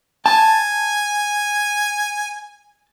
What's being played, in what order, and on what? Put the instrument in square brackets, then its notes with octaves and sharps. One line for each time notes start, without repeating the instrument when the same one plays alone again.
[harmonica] G#5 [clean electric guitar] A5